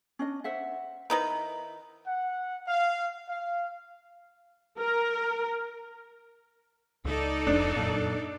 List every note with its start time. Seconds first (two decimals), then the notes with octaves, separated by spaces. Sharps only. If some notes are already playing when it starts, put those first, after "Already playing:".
0.19 C#4 D4 D#5
0.44 C5 E5 F#5
1.10 D#3 D#4 E4 B4 C5 A#5
2.07 F#5
2.68 F5
3.30 F5
4.79 A#4
7.05 C#2 D#4 A4 D5
7.47 F1 F2 D4
7.76 F#2 A#2